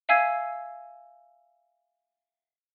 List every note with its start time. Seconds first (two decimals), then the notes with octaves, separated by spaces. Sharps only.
0.09 E5 F5 G#5 E6 G#6 C7